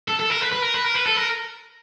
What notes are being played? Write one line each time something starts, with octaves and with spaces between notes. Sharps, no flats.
A4
A4
A#4
B4
B4
A#4
B4
A#4
B4
A4
A#4